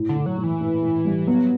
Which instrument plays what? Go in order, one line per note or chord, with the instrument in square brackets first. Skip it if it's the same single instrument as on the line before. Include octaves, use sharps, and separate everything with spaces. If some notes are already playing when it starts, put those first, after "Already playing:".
Already playing: [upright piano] A2
[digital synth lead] D3
[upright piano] A2
[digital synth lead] F#3
[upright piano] A2
[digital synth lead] E3
[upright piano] A2
A2
G3
[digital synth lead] F#3 [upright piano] B3